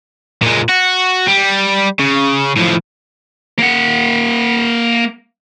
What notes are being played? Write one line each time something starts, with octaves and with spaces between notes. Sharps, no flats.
A#2 G#3
F#4
G3
C#3
A2 F3
A#3 F#5